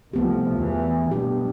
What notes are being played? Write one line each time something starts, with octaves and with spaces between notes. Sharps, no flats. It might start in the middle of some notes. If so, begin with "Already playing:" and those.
C2 F3 A3 B3 G4
E2 E3
G2 B2 B3 D4 G4